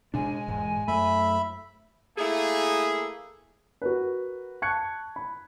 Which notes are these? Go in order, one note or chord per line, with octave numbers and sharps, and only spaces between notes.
B2 G#3 D4 G#5
E1 G#2
F#2 A3 E5 B5
A3 A#3 E4 G#4
F#4 A#4 B4
A5 C#6 F#6 G#6 C#7
B5